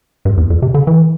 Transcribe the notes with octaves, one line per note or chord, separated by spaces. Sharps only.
G2
E2
F2
C3
D3
E3